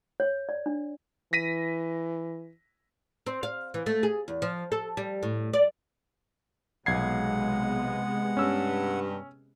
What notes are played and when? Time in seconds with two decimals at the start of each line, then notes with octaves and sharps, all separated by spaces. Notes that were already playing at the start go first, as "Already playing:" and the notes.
0.20 C#5
0.49 D5
0.66 D4
1.33 E3 A#6 B6 D#7
3.26 C4
3.43 F5
3.74 E3
3.86 A3
4.03 G#4
4.28 E2
4.42 F3
4.72 A4
4.97 G3
5.23 A2
5.53 D5
6.86 B1 C3 G#3 B3 F#5 G#6 C7
8.37 G2 C#4 E6